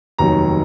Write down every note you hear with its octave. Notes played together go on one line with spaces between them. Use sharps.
F1 D#2 D#3 F#3 A#5